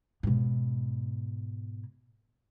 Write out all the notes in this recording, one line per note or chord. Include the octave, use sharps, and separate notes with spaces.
G#2 B2